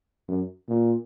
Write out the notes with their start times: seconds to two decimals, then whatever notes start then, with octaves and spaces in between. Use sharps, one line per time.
0.29 F#2
0.69 A#2